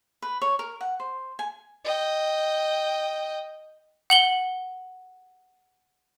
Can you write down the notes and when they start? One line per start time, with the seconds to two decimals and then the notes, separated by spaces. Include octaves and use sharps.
0.22 B4
0.42 C#5
0.59 A#4
0.81 F#5
1.00 C5
1.39 G#5
1.84 D#5 G5
4.10 F#5 F#7 G7